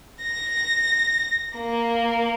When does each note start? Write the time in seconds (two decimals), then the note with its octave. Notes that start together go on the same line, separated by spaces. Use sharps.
0.23 A#6
1.57 A#3